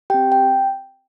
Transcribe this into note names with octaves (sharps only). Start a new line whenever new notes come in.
C4 G4 G5
G5